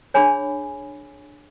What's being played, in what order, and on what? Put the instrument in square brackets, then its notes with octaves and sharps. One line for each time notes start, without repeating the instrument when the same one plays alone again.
[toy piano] D4 G#4 C#5 G#5 B5